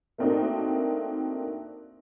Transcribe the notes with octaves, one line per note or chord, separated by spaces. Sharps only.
A3 A#3 C4 D4 D#4 F#4